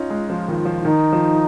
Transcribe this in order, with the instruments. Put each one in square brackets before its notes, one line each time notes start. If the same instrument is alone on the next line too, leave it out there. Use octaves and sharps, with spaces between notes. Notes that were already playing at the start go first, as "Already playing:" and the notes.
Already playing: [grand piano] C#4 D#4 [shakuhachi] F4
[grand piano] G#3
F3
D#3
F3
[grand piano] D#3 [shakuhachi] D#4
[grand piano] F3